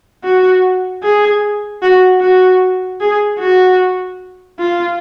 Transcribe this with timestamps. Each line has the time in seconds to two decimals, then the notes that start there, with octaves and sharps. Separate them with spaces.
0.24 F#4
1.03 G#4
1.82 F#4
2.21 F#4
3.01 G#4
3.40 F#4
4.59 F4